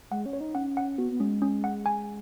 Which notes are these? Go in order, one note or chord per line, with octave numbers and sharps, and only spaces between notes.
G#3 F#5
C#4
C#5
D#4
C#4 F#5
F#5
B3 F#4
B3
G#3 C#4
C#4
F#5
G#5